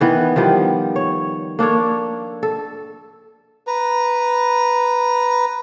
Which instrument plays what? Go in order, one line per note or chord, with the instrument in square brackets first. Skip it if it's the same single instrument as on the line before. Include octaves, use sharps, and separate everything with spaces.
[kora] D#3 E3 B3
D#3 F3 G3 B3
C#5
A#3 D4 A4 C#5
A4
[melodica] B4 A#5